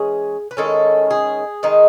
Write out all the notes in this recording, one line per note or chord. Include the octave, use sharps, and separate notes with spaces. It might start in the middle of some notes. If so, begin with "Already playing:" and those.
Already playing: E3 G#3 C#4 G#4
B4
D#3 G#3 C#4 E4 A4
G#4
D#3 G#3 D#4